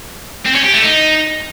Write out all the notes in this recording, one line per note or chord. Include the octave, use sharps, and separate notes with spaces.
C4
C#4
G4
A3
D#4